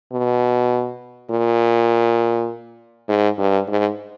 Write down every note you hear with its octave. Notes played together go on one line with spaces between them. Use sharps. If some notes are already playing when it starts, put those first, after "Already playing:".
B2
A#2
G#2
G2
G#2